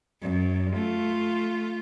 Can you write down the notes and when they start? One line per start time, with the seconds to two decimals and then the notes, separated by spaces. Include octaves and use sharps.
0.22 F#2
0.73 A3 F4